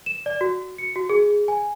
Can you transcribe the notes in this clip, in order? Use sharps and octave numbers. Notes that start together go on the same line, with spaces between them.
E7
D5
F#4
C#7
F#4
G#4
G#5